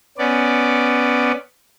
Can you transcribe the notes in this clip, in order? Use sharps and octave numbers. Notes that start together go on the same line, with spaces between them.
B3 C#4 D5